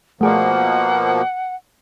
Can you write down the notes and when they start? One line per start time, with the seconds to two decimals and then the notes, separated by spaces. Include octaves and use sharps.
0.21 B2 F3 A3 A#3 G#4 D5 F#5